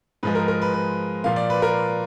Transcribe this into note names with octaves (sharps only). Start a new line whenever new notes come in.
G#2 F3 G#3 B4
A#4
A#4
B4
B4
A#2 F3 A#3 F5
D5
B4
A#4